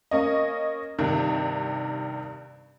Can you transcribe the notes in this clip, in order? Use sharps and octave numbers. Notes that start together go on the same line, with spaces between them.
A#3 C#4 D#5
G2 C3 D#3